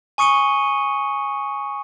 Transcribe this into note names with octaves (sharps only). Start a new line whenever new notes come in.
G#5 C#6 D#6 C#7 D#7 G7